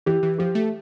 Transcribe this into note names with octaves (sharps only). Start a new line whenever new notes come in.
E3 G4
E3
F3 G4
A3